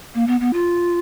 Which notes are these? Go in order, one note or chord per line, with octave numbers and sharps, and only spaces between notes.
A#3
B3
B3
F4